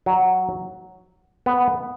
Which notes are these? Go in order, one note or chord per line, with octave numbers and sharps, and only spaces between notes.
F#3
B3